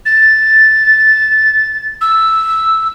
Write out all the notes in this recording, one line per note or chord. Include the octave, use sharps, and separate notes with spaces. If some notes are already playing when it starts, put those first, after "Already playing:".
A6
E6